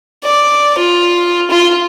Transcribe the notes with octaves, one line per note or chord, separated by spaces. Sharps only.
D5
F4
F4